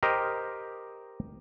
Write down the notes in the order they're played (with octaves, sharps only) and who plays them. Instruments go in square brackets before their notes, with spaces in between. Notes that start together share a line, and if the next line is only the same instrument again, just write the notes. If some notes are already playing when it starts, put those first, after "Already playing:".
[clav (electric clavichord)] G4 A#4 C5 D#5